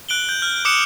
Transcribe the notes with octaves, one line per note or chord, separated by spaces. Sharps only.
F#6 D7 F#7 G7
G6
F6
D6 D#6 F#6 C#7 E7